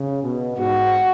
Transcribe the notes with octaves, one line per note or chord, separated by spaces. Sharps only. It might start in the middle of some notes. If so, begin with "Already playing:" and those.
Already playing: C#3
B2
G#2 F#4